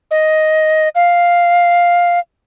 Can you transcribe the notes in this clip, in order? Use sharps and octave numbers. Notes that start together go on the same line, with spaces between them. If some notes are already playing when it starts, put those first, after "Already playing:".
D#5
F5